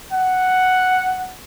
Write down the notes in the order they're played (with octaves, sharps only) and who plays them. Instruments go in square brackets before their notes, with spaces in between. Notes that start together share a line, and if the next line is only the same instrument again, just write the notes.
[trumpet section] F#5